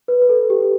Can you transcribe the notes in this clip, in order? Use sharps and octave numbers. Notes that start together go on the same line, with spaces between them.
B4
B4
A4
G4
G4